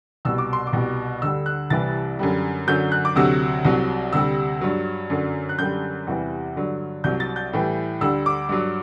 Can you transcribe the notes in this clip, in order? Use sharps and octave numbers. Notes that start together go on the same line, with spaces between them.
C2 B2 G3 E6
D6
C6
D6
C2 B2 G3
D2 D3 G3 E6
F#6
C2 C3 E3 G3 A6
F#2 D3 G3
F#2 D3 F#3 G6
F#6
D6
D2 C3 F#3 E6
C2 C3 F#3
D2 C3 G3 E6
G2 F#3
F#2 D3 F#3
F#6
F#2 D3 G3 G6
E2 C3 E3 G3
G2 D3 F#3
C2 C3 F#3 G6
A6
G6
A2 E3 G3
D2 D3 G3 E6
D6
G2 F#3